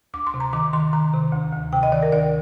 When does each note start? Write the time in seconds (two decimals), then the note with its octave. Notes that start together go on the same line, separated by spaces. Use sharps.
0.14 D2 D6
0.27 C6
0.34 C3
0.40 A#5
0.53 D#3 D6
0.73 D#3 C6
0.93 D#3 A#5
1.13 C3
1.33 D2
1.53 D2
1.73 C3 G5
1.83 D#5
1.92 D#3 D5
2.03 A#4
2.12 D2 D5